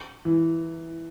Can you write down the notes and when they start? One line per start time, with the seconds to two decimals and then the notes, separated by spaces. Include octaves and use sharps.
0.25 E3